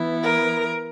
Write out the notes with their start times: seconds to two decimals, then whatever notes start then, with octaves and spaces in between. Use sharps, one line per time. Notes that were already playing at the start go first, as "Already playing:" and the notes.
Already playing: E3 B3 E4
0.22 A#4